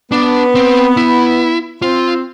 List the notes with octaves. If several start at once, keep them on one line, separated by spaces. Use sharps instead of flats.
B3 D4
C4
E4
C4 F4